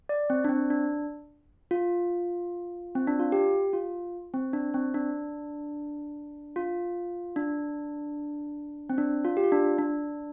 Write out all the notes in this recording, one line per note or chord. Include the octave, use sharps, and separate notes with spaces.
D5
C4
D4
C4
D4
F4
C4
D4
F4
G4
F4
C4
D4
C4
D4
F4
D4
C4
D4
F4
G4
F4
D4
D4